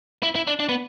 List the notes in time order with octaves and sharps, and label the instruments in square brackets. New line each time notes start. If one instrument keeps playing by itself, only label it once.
[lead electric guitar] E4
E4
D4
D4
B3